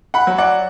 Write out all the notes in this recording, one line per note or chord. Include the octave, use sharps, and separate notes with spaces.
F#5 B5
F#3
D5 F#5